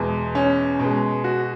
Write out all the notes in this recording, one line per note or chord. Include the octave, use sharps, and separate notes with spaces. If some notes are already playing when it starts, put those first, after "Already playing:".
Already playing: E2 B2 G#3
C#4
B2 G#3
F#4